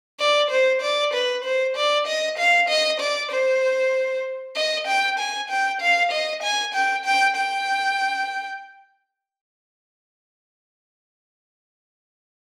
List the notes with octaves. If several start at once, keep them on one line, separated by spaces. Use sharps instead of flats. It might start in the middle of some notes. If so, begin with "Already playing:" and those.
D5
C5
D5
B4
C5
D5
D#5
F5
D#5
D5
C5
D#5
G5
G#5
G5
F5
D#5
G#5
G5
G5
G5